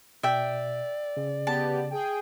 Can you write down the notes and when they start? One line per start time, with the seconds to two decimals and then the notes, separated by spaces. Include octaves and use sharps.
0.23 B2 D5 E5 G5
1.17 C#3
1.47 B3 G4 A5
1.91 G#4 G5